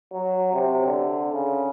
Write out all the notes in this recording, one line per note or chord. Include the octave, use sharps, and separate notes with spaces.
F#3
C3
D3
C#3